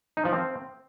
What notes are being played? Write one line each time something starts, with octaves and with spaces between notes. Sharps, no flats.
D#4
F3
C4